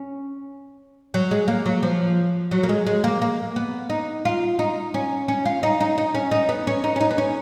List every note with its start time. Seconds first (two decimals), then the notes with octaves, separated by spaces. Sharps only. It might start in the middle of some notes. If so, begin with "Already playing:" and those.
Already playing: C#4
1.14 F#3
1.31 G#3
1.48 A#3
1.66 F#3
1.83 F3
2.51 F#3
2.63 A#3
2.69 G#3
2.87 G#3
3.04 A#3
3.22 A#3
3.56 B3
3.90 D#4
4.25 F4
4.59 D#4
4.94 C#4
5.28 C#4
5.45 F4
5.63 D#4
5.80 D#4
5.98 D#4
6.15 C#4
6.31 D#4
6.49 B3
6.67 C#4
6.84 D#4
6.96 C#4
7.01 D#4
7.10 B3
7.18 C#4